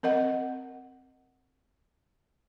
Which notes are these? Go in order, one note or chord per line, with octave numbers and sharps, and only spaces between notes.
C4 A#4 D#5 F#5